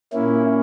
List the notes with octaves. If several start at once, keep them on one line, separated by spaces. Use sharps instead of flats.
A#2 A#3 C#4 E4